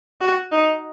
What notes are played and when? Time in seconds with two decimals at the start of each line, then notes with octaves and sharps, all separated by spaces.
0.21 F#4
0.52 D#4